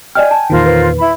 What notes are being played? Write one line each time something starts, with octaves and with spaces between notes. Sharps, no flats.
D5 D#5 G5 G#5 F6
A5
E2 A#2 D#3 F4 A#4 C5
B4
E4 B5